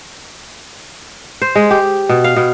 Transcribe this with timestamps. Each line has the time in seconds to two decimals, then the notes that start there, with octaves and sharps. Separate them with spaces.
1.42 C5
1.56 G#3
1.71 G4
2.09 B2
2.24 F5
2.36 B2